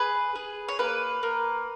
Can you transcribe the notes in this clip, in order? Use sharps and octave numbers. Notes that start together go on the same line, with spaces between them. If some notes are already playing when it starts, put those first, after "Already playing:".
Already playing: G#4 B4
G#4
C#5
A#3 B4
A#3